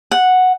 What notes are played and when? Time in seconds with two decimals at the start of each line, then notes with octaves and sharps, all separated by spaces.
0.11 F#5